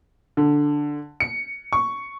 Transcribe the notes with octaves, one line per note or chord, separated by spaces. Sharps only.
D3
C#7
C#6